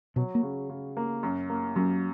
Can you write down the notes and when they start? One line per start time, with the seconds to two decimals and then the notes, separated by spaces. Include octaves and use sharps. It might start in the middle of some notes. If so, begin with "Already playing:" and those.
0.16 B2 F#3
0.35 A#3
0.43 C#3
0.70 C#3
0.97 A#3
1.23 F#2
1.50 A#3
1.76 F#2 F#3